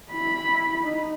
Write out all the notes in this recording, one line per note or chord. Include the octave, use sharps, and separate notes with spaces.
E4 B5
D#4